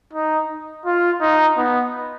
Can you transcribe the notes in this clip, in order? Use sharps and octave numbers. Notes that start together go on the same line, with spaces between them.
D#4
F4
D#4
B3